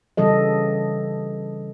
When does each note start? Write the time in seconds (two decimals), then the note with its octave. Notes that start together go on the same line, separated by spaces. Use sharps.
0.17 C#3 E3 G3 A4 D#5